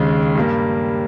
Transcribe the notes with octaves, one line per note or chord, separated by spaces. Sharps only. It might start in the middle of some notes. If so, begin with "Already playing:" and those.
Already playing: D#2 C#3 G#3
G2 G3 A#3